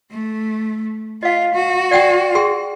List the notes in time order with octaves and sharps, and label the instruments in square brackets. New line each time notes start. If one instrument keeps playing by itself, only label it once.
[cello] A3
[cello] F4 [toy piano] D#5 F5
[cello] F#4
[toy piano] D5 F#5 G5
G#4 G5 C6